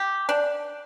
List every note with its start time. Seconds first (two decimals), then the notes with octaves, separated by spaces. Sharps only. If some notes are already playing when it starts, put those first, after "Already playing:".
Already playing: G4
0.29 D4